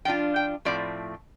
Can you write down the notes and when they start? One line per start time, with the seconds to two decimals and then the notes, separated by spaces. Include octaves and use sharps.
0.05 F3 D4 F4 G5
0.36 G5
0.65 A2 F3 A3 C4 D5